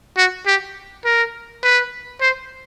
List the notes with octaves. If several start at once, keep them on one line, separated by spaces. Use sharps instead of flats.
F#4
G4
A#4
B4
C5